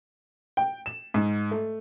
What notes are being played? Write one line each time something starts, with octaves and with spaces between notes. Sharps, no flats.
G5
E7
G#2
A3